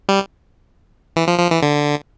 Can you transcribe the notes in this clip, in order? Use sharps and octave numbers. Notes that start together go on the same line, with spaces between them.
G3
E3
F3
F3
E3
D3